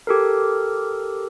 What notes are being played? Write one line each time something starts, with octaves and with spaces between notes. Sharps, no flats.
G4 A4 A#4